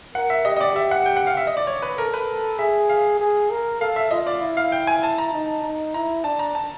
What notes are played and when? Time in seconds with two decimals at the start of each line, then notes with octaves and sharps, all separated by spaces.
0.15 A#4 F#5
0.30 E5
0.45 G4 D#5
0.57 D#5
0.61 D5
0.75 G4 E5
0.91 F#5
1.06 G5
1.17 F#5
1.27 F5
1.37 E5
1.47 D#5
1.57 D5
1.67 C#5
1.82 B4
1.97 A4 A#4
2.14 B4
2.59 G#4 E5
2.89 F5
3.19 G#4
3.51 A#4
3.80 A4 F5
3.96 E5
4.11 F4 D#5
4.27 D5
4.41 E4
4.57 F5
4.72 G5
4.87 G#5
5.03 A5
5.18 A#5
5.33 D#4
5.63 D#4
5.94 E4 A#5
6.24 D4 A5
6.39 A#5
6.55 A5